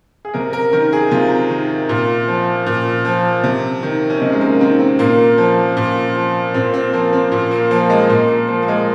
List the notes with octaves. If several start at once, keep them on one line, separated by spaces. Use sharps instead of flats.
G#4
C3 A#4
A#4
D#3 A#4
G#4
C3 F4
D#3
A#2
F3
A#2
F3
C3
D#3
C#4
C3 D#4
G#3
A#3
D#3 C4
C4
A#2 A#3
F3
A#2
F3
A#2 C4
C4
F3 A#3
C4
A#2
A#3
F3 A#3
G#3
A#2 A#3
A#3
F3 A#3
A#3
G#3